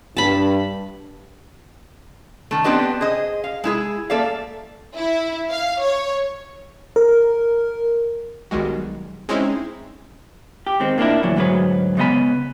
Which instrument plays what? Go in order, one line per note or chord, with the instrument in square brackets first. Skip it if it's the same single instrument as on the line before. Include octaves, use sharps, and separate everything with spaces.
[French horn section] G2 [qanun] A5 B5
[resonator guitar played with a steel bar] D#3 A3
B3 C4 D4 G4 B4 D#5
G#4 C5 D#5
F5
G#3 E4 G#4
A#3 A4 D5 E5 F5
[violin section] E4
F5
C#5
[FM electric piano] A#4
[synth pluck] B1 D#3 G3 G#3 F#4
G#3 C4 C#4 D#4 E4
[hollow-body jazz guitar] G4
D#3 G#3 C4
A#2 A#3 D4 E4
D2 A#2 E3 F#3
D2 G#2 F#3 G#4 B4
C#3 G#3 B3 D#5 G#5 B5